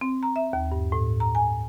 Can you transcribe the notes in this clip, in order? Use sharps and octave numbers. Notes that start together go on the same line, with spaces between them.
C4
A#5
E5
D#2
G2
A2
A#5
G#5